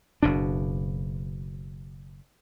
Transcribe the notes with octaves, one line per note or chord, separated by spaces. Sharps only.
F#1 B2 D4